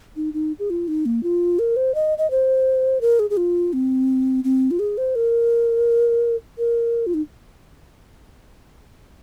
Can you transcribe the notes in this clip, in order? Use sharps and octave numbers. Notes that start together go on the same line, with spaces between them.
D#4
D#4
G#4
F4
D#4
A#3
F4
A#4
C5
D#5
D#5
C5
A#4
G#4
G#4
F4
C4
C4
F4
G#4
C5
A#4
A#4
F4
D#4